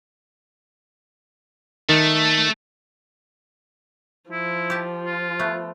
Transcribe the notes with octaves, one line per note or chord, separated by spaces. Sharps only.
D#3 A3
F3 E4
G4 A5
F4
A3 B3